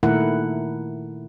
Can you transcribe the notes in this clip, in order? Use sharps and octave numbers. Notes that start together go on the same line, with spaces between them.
A#2 D#3 A3 E4 A#4 F#5